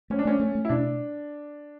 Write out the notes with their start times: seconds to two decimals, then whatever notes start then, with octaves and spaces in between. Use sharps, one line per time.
0.10 A3 C#4
0.19 D4
0.25 A3 C#4
0.40 A3
0.55 A3
0.65 E4
0.69 B2 D4